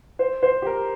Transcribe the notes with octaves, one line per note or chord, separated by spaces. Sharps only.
C5
C5
G4
A#4